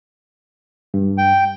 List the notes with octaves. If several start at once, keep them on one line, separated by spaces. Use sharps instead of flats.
G2
G5